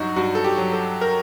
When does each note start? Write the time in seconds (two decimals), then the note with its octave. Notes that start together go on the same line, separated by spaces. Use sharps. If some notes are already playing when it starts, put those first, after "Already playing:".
Already playing: G2 F#3 D#4 F#4
0.16 G2 F#4
0.35 A4
0.44 G4
0.58 F#3
0.73 A4
1.01 A#4